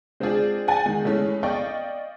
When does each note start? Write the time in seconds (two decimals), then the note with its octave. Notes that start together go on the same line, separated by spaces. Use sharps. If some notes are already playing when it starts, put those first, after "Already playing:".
0.20 G#3 C4 D4 F4 G#4 D5
0.68 F#5 G#5 A6
0.86 D#3 G#3
1.04 E3 G#3 A3 C#4
1.43 D5 D#5 F5 G5 C#6